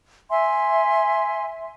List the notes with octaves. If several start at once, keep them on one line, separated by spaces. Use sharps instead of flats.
E5 G#5 C6